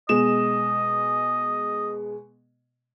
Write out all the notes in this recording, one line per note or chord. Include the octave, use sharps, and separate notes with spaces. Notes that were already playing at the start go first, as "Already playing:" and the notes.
B2 G#3 D#5 E7